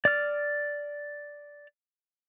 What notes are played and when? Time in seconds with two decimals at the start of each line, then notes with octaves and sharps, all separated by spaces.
0.05 D5 F6